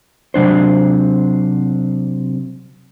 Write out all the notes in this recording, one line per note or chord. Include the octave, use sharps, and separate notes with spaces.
C3 F#3 D4 C5